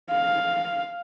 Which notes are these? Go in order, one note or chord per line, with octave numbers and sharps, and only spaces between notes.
F5